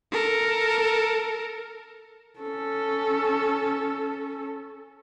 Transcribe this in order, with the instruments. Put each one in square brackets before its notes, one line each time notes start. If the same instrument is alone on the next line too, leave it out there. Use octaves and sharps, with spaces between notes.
[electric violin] A4 A#4
[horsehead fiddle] C#4 A4